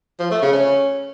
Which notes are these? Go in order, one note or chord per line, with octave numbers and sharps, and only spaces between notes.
F3
A3
C#3
C#4